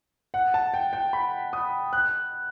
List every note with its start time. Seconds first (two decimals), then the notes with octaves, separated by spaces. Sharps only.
0.34 F#5
0.54 A5
0.74 G5
0.93 G5
1.13 B5
1.53 D#6
1.93 F#6